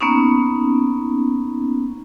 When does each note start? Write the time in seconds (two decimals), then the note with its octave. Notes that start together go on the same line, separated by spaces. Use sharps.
0.01 A#3 B3 C#4 D#4